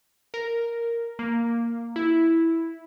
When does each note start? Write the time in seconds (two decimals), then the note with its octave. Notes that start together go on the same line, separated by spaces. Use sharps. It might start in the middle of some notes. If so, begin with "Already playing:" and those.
0.34 A#4
1.19 A#3
1.96 E4